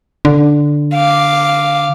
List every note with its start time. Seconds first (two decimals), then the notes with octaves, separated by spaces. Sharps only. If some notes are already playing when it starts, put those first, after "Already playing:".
0.25 D3
0.95 F5 D6